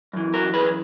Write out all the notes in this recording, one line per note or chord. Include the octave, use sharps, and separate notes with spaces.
F#2 E3
F#4 A#4
G#4 B4